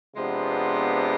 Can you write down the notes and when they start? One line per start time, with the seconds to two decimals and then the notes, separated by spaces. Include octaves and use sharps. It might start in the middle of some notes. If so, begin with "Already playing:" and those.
0.15 C3 F3 G#3 B3 D4